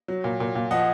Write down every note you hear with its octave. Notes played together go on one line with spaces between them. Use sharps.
F#3
A#2
A#2
A#2
F3 D#5 F#5